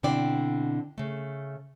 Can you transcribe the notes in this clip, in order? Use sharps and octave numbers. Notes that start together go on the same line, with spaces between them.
B2 D3 C4 E4 D5 G5
C#3 A3